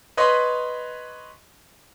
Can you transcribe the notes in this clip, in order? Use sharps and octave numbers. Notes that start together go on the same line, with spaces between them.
B4 C#5 D#5 B5 C6